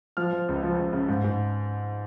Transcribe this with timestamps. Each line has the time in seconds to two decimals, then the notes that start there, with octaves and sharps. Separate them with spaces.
0.17 F3 F6
0.33 F3
0.48 C#2
0.63 F3
0.78 C#2
0.93 C#3
1.08 G#2
1.24 G#2